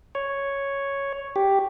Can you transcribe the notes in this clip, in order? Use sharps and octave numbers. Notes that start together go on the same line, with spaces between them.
C#5
G4